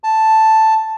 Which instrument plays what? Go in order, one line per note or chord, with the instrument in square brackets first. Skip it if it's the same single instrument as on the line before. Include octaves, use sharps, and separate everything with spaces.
[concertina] A5